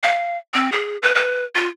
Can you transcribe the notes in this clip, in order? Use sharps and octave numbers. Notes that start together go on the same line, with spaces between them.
F5
C4
G#4
B4
B4
F4